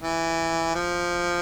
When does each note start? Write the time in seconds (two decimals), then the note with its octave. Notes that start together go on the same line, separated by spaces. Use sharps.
0.01 E3
0.75 F3